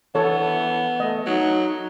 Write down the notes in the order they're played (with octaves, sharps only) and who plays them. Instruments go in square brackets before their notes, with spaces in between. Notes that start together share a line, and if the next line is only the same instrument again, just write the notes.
[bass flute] E3 [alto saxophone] B3 [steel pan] A4 C#5
[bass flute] A3 [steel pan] D#5
[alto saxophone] F#3 [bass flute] D#4